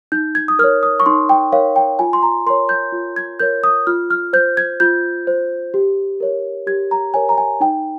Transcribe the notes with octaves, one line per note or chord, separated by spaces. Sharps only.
D#4 G6
G#6
D#6
A#4 C#5 F6
D#6
C#6
D#4 C6
G5
A#4 C#5 F5
G5
F4 G#5
C6
A#5
A#4 C#5 C6
G6
F4
G#6
A#4 C#5 G6
D#6
F4 F6
F6
C5 G6
G#6
F4 G6
C5
G4
A#4 C#5
G4 G#6
A#5
A#4 C#5 G#5
A#5
G#5
D#4 G5